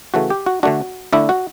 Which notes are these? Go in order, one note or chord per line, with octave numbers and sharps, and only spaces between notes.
C#3 E3 A3 F#4
G4
F#4
D3 A3 D4 F#4
D3 A3 D4 E4
F#4